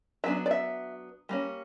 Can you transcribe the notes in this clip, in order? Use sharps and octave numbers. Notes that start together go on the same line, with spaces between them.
F#3 B3 D4 E5
D5
E5
G3 A#3 C#4